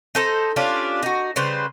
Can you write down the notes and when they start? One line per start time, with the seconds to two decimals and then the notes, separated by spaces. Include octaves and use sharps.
0.15 D#4 A4 C5
0.56 C#4 D4 F4 G4
1.03 D#4 F#4
1.36 C#3 G3 B4 C5